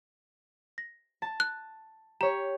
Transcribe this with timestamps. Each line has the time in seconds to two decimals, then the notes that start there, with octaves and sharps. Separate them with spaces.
0.78 A#6
1.22 A5
1.40 F#6
2.21 G4 C#5 A#5